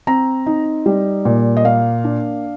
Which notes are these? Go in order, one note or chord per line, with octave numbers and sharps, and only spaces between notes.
C4 A#5
D#4
G3
A#2
D#5
A#3 F5
D4